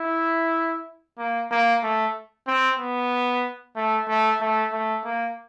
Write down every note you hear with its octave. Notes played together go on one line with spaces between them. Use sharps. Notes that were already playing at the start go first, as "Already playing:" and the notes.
Already playing: E4
A#3
A#3
A3
C4
B3
A3
A3
A3
A3
A#3